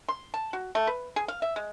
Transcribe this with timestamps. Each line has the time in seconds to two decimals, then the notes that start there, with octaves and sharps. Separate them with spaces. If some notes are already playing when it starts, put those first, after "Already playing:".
0.08 C6
0.34 A5
0.53 F#4
0.75 A3
0.87 B4
1.16 G#4
1.28 F5
1.42 E5
1.56 G#3